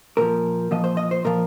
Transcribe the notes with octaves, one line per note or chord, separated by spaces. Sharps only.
A#2 F3 A#4
A#2 F3 D#5
C5
D#5
C5
A#2 F3 A#4